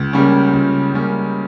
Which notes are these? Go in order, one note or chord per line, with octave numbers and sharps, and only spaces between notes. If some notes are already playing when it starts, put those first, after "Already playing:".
Already playing: C#2
C#3 G3 A#3 C#4
C#2
C#3 G3 A#3 C#4